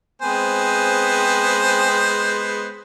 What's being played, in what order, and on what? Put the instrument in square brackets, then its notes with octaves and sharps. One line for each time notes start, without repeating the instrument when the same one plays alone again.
[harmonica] G#3 B3 C5 [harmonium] C4 G#5